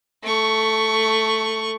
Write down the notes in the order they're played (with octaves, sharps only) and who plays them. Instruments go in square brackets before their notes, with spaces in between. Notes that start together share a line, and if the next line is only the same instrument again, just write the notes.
[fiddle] A3 C#6